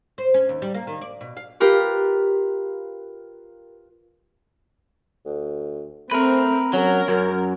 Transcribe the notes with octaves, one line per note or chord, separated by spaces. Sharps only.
C5
C#4
D#2
G3
A#3
D#3
D5
B2
F5
F4 G4 A#4 B4
D2
A3 C4 A#4 B4
F#3 C#4 A#4
F#2 F#3